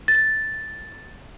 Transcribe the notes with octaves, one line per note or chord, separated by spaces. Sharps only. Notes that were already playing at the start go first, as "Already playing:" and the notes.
A6